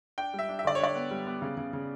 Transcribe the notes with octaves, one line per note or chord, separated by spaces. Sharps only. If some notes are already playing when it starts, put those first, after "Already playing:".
D4 G5
G3 E5
D4
E5
D3 D5
C#5
D4 D5
B3
G3
B3
C#3
C#3
C#3